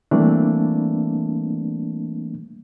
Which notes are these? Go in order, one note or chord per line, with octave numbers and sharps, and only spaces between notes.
E3 G3 A3 A#3 C4 D4